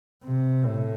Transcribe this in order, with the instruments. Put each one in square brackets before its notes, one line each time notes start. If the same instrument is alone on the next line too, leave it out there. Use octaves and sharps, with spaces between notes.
[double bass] C3
A2